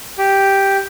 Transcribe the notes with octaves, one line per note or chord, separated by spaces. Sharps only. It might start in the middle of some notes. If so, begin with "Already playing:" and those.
G4